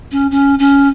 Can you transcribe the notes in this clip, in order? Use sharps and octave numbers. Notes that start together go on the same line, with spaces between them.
C#4
C#4
C#4